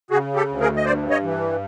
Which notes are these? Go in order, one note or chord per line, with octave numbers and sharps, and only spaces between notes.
C#3 F#4 G#4
G4 A4
D2
G#4 A#4
D#5
G2 C5 D5
C#5 D#5
E3